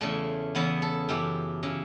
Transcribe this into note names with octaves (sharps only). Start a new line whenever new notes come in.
E2 C#3 E3 A3
E2 C#3 E3 B3
A4
F#2 E3 G4
C#3 E3